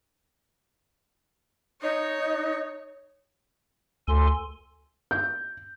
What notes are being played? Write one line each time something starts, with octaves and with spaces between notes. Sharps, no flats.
D#4 C#5
D2 A4 G#5 C6
G6